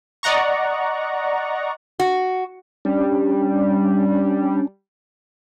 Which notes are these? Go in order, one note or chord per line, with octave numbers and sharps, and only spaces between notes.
D5 D#5 F#5 A#5 C#6
F#4
G3 C#4 D4